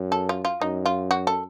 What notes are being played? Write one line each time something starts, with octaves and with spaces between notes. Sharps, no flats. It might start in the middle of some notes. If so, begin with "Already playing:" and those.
Already playing: F#2
A4
F4
F4
F#2 D#4
F4
F#4
A4